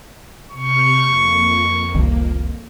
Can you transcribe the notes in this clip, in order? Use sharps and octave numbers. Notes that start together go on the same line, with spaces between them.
C3 C#6 F6 G6
F2 A#3
F1 C2 D#3